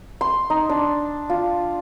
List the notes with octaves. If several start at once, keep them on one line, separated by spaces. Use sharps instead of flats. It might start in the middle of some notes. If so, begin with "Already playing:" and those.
C6
D#4
D4
F4